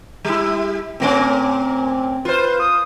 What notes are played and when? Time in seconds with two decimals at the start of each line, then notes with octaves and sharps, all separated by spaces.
0.25 G3 E4
1.00 A#2 A3 C4 C#4
2.25 F4 B4 C5
2.60 D#6